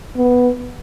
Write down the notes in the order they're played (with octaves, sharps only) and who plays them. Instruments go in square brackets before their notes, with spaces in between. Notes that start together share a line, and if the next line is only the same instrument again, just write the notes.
[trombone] B3